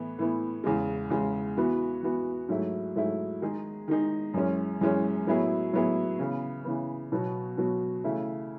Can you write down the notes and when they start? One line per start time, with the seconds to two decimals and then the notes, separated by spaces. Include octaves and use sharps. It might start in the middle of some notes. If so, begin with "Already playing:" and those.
Already playing: A2 E3 B3
0.18 A2 E3 B3
0.64 E2 C#3 G#3
1.10 E2 C#3 G#3
1.57 E3 B3 F#4
2.02 E3 B3 F#4
2.49 G#2 F#3 A3 E4 G#4
2.96 G#2 F#3 A3 E4 G#4
3.42 D#3 G#3 D#4 G#4
3.88 D#3 G#3 D#4 G#4
4.34 F#2 E3 G#3 C#4
4.81 F#2 E3 G#3 C#4
5.27 A2 F#3 B3 E4 G#4
5.73 A2 F#3 B3 E4 G#4
6.19 C#3 E3 B3
6.65 C#3 E3 B3
7.12 B2 F#3 B3 F#4
7.57 B2 F#3 B3 F#4
8.04 C#3 E3 A3 E4